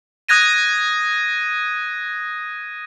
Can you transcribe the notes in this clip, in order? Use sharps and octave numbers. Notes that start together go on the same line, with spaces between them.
D#6 F#6 G#6 A#6 D#7